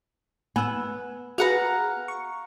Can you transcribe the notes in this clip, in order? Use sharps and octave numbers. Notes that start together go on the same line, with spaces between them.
B3 G#5 E6
F#4 G#4 B4 F5 F#5 A#5
C#6